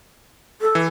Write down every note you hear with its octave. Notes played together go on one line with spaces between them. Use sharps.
A4
E3